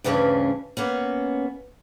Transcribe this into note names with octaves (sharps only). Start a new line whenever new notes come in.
D2 G2 C#3 E3 C#4 D4
A#3 B3 C#4